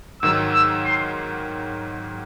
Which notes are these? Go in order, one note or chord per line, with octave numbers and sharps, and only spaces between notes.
G#2 D#3 F#3 E6
E6
C6